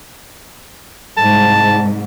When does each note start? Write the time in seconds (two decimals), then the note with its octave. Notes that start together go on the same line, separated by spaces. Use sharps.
1.17 C2 G#2 A5